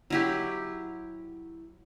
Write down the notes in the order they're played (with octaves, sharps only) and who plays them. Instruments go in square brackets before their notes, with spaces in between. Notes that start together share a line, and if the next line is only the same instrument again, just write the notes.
[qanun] F#3 E4 G4